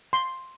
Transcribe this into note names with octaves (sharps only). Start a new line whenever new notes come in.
C6